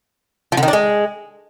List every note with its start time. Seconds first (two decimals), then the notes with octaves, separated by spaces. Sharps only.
0.52 F3
0.57 D3
0.63 D#3
0.68 D4
0.73 G#3